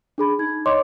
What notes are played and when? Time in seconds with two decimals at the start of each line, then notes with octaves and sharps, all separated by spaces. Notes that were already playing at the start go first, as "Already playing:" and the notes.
0.18 D4 G#4 B5
0.39 D#4 G#6
0.66 C#5 D#5 C6 D6